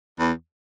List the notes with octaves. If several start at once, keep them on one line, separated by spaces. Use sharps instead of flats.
E2